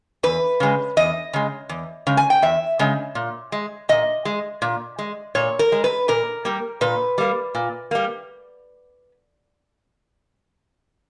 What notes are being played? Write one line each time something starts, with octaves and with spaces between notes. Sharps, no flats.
E2 B4
C#3 G#3
E2 D#5
C#3 G#3
E2
C#3 G#3
G#5
G5
E2 E5
C#3 G#3
A#2
G#3
A#2 D#5
G#3
A#2
G#3
A#2 C#5
A#4
G#3
B4
A#2 A#4
G3 A#3
A#2 B4
G3 A#3
A#2
G3 A#3